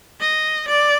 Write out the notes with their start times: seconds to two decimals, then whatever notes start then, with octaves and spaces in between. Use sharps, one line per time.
0.20 D#5
0.68 D5